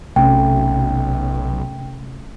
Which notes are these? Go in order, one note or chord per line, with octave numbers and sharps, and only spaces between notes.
B1 C3 A3 C#4 G5